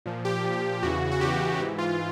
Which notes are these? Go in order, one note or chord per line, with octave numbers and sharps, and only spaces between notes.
A#2 F3
G4
A#2 F3
E2 C#3 E3 F#4
F#4
E2 C#3 E3 G4
G#2 E3
F4